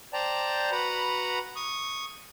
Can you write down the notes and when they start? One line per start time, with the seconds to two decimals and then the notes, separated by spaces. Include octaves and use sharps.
0.13 C5 D5 G5 A5 A#5
0.72 F#4 B4 F#5 A#5 B5
1.56 C#6 D#6